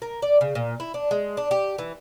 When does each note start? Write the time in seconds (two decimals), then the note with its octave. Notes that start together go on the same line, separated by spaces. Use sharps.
0.02 A#4
0.22 D5
0.41 C#3
0.55 A#2
0.80 E4
0.94 D4
1.11 G#3
1.37 D4
1.51 G4
1.78 E3